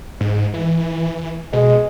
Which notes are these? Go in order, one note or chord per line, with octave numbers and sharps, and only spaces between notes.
G#2
E3
B2 G#3